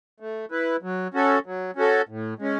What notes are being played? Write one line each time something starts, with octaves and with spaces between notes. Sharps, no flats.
A3
E4 B4
F#3
C#4 F#4 A4
F#3
C#4 F#4 A4
A2
G#3 C#4